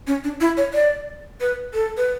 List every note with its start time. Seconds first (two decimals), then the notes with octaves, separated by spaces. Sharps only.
0.07 C#4
0.24 D4
0.41 E4
0.57 C#5
0.74 D5
1.41 B4
1.74 A4
1.97 B4